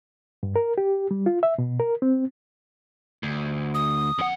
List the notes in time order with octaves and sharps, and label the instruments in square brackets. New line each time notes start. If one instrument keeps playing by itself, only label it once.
[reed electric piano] G2
A#4
G4
G3
F4
E5
B2
A#4
C4
[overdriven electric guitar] D2
[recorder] D#6
[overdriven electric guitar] F2 F#5